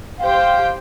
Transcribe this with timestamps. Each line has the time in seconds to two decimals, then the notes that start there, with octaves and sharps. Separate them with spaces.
0.20 G4 C5 F5 G5